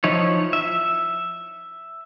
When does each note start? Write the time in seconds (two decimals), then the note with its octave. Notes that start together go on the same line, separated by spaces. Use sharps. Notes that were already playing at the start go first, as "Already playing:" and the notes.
0.04 F3 D#4 E4 C#5
0.53 E5